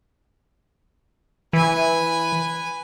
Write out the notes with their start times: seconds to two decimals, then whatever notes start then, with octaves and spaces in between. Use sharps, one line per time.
1.53 E3 B4 G#5